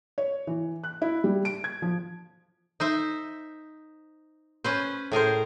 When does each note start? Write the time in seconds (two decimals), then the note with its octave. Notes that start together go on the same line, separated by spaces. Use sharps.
0.18 C#5
0.47 E3
0.84 F#6
1.02 E4
1.24 G3
1.45 D7
1.64 G#6
1.82 F3
2.80 D#4 C5 E5
4.64 C#4 B4 C5
5.12 A2 G#4 A#4 C5